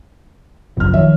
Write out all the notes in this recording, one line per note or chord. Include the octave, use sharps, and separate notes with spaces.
F#1 B1 F2 F6
D#3 F3 C#5 E5